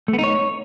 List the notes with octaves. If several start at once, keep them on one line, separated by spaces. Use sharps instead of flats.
A3
B3
D#4
C#5